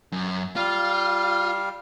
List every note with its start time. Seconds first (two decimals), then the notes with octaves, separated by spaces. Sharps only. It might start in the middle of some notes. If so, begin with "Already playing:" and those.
0.12 F#2
0.56 G3 F4 F5